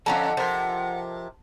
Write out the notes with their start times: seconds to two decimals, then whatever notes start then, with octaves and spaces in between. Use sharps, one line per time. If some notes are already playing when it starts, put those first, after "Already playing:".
0.06 F2 D3 C#4 F4 A4 F#5 A#5
0.37 C3 F3 A#4